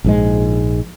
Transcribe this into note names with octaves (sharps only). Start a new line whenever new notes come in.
A#1 G#2 G#3